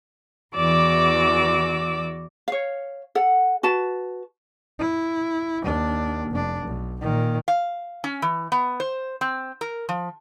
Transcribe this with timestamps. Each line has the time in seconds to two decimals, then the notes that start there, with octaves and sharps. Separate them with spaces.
0.55 E2 E3 F#4 D5 D6 E6
2.48 C#5 F5
3.15 A4 F#5
3.63 F#4 B4 A5
4.79 E4
5.62 D#2 D4
6.30 F1 D4
6.66 B1
7.01 A#2 D#3
7.48 F5
8.04 C#4
8.22 E3
8.52 B3
8.80 C5
9.21 C4
9.61 A#4
9.89 F3